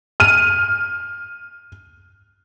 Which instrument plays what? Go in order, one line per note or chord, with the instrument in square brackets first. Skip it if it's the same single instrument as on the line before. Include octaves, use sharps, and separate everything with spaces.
[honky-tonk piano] F6 D#7